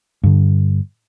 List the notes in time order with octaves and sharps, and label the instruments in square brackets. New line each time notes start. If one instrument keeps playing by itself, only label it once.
[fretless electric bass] G2 D3